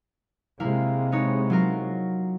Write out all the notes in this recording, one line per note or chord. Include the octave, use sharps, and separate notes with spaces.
C3 G#3 A#3 E4 F5
B3 D#4 C#5
F#3 F4 A#4